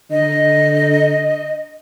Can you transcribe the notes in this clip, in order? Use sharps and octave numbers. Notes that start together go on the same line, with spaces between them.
D3 D#5